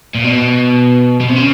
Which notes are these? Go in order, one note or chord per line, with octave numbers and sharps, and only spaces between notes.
A#2
B2
B2
C3
C#3